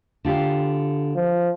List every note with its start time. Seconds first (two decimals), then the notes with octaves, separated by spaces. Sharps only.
0.25 D3 F4 G4
1.16 F3